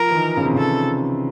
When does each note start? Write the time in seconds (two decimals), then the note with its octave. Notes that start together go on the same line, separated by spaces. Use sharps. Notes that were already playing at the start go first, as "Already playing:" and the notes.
Already playing: F3 A#4
0.11 E3
0.15 D#3
0.37 C#3
0.45 C3
0.54 C#3 A4